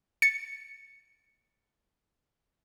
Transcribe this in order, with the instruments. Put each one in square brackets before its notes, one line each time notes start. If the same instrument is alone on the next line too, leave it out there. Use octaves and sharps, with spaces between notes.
[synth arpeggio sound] A6 C#7